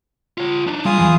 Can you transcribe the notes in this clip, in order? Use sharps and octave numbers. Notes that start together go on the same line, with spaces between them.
F4 C#5
D4 D#4
A2 G3 F4 G#4 G#5 D#6
E2 E3 F3 G#5